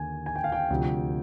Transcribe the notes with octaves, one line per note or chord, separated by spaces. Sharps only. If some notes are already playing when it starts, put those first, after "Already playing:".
Already playing: D#2 D3 G#5
G#5
G5
F5
G5
D2 C3 F3